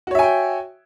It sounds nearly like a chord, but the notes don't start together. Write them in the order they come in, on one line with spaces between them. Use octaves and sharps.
F#4 C#5 E5 G#5 G5